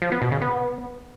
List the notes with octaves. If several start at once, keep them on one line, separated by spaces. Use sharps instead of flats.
F3
B3
B2
C#3
B3